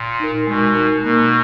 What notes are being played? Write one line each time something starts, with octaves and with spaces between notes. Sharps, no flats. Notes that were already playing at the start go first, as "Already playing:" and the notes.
Already playing: A#2
D#4 A#4
B2 G#3
D#4 A#4
B2 A#3